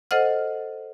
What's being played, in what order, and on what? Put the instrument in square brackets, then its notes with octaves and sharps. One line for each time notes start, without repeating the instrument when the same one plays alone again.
[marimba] A4 C5 D#5 F#5 F6